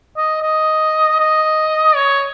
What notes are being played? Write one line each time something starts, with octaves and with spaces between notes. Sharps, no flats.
D#5
D#5
D#5
C#5